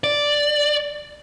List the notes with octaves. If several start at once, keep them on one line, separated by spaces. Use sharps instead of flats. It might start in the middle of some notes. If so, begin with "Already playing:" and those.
D5